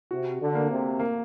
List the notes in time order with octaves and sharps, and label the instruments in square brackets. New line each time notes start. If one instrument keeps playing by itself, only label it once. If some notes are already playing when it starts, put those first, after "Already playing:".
[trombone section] C3 [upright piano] F#4
[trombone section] D3
[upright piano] A#3
[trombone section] C3
[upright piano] A#3